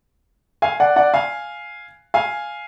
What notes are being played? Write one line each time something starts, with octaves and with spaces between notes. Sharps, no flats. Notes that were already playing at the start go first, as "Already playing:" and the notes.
F5 G#5
D5 F#5
D5 F#5
F5 G#5
F5 G#5